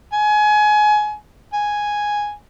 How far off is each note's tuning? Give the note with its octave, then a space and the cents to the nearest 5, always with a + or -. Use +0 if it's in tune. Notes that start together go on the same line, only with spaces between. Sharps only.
G#5 +25
G#5 +0